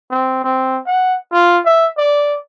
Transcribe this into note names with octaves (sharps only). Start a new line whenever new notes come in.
C4
C4
F#5
F4
E5
D5